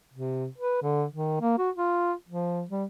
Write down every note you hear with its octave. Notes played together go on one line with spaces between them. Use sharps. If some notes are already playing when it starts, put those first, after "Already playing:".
C3
B4
D3
D#3
A#3
F#4
F4
F3
G3